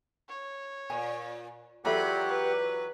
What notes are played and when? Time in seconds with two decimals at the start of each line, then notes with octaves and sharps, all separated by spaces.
0.28 C#5
0.90 A#2 G#5
1.85 E2 F#3 F4 G4 A4 E5 F#5 B5
2.29 B4